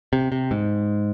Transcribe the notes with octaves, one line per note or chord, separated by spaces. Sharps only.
C3
C3
G#2